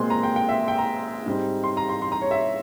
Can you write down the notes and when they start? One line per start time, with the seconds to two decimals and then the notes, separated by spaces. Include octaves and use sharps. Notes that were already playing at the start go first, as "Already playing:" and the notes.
Already playing: A#2 G#3 C4 C6
0.10 A#5
0.23 G5
0.36 G5
0.49 E5
0.68 G5
0.78 A#5
1.26 G#2 G3 C4
1.64 C6
1.77 A#5
1.89 C6
2.02 C6
2.12 A#5
2.22 C#5
2.31 E5